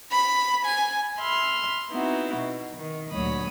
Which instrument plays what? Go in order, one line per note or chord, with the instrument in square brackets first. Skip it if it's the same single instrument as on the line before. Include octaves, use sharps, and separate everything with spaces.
[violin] B5
G#5
[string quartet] E5 B5 C6 F6
B3 C4 D#4 E4 F#4
B2
D#3
D2 A#2 F#3 C#5 B5 D#6